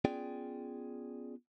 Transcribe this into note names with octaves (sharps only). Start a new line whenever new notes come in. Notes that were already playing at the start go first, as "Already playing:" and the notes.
B3 C#4 F4 G#4 D5 G5